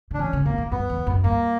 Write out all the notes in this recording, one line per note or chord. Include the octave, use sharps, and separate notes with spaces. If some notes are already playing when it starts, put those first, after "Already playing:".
D3
D4
E3 C#4
C#3
B2 A#3
A#2
G2 B3
E2
F#2
G2 A#3